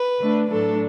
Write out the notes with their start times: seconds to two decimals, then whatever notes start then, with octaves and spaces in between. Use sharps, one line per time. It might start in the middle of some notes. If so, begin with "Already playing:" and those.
Already playing: B4
0.20 D3 A3 D4
0.51 A2 F#3 A3 D4 A4